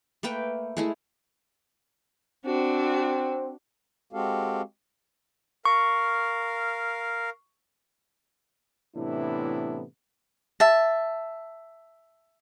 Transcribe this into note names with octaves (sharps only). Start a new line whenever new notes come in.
A3 A#3 B4 G5
G#3 A3 E4
C4 D4 F#4
G#3 C4 F#4 G4 A4 F5
A#4 F5 C#6
A2 C3 E3 B3 D4 E4
E5 A5